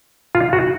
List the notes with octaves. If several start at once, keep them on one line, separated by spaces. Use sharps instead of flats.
F4
F#4